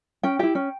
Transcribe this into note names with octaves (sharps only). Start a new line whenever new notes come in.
C#4 G5
E4 G4 G5
C#4